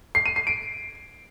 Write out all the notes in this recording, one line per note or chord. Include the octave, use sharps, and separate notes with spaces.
C7
D#7
C7
D7